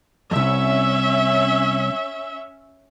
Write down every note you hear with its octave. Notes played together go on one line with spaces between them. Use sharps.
C2 F2 C#4 E5